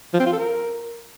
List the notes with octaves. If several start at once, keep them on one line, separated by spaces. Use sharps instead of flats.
F3
C4
F4
A4
A#4